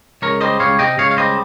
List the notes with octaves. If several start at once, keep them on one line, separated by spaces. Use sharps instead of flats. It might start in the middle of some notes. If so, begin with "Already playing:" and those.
C#2 A#4 C#5
G3 C5 D#5
C#2 C#5 F5
C3 D#5 G5
C#2 C#5 F5
F5
G3 C5 D#5